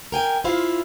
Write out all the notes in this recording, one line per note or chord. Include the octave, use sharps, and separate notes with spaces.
A#4 G5 G#5
E4 F4 C5 F5